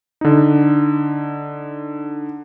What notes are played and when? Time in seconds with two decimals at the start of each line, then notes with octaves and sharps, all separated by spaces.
0.21 D3 D#4